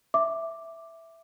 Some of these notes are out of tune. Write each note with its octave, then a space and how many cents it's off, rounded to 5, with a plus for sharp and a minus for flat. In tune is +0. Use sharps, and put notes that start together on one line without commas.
E5 +0 D6 +0